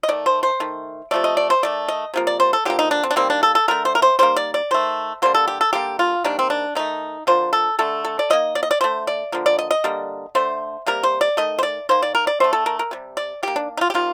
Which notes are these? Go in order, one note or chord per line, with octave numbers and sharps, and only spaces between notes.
D#5
D#3 A3 D5
C5
C5
D#3 A3
C3 F3 A3 D5
D#5
D5
C5
D#3 A3 D5
D#5
C3 F3 A#3
D5
C5
A4
D3 F3 A#3 G4
D#4
D4
C4
D4
D#3 G3 A#3 C4
D4
A4
A4
D3 A3 A#4
C5
A#4
C5
D#3 G3 A#3 C5
D5
D5
D#3 A3 C5
D3 G3 A#3 C5
A4
G4
A4
D3 G3 A#3 G4
F4
C3 D#3 G3 A#3 D4
C4
D4
D#3 A3 D#4
D3 F3 A#3 C5
A4
D3 A3 A4
A4
D5
D#3 A#3 D#5
D5
D#5
D5
D3 A3 C5
D5
D3 F3 A#3
D5
D#5
D#5
D3 G3 A#3
D3 A3 C5
C3 G3 A#3 A#4
C5
D5
D#3 A3 D#5
C5
D5
D#3 A#3 C5
D5
A#4
D5
D3 A3 C5
A4
A#4
A#4
C3 G3
D5
D#3 A#3 G4
D4
D#4
F4
G4
C3 D#3 G3 A#3 F4